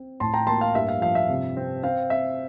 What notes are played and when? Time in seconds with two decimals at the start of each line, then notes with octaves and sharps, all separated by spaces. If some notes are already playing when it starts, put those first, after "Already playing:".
Already playing: C4
0.20 A2 A5 C6
0.34 G5 A#5
0.47 A#3 A5 C6
0.61 F5
0.75 G2 E5
0.89 F5
1.01 F3 F5
1.15 E5
1.29 C3
1.57 C4
1.83 C4 F5
2.10 C4 E5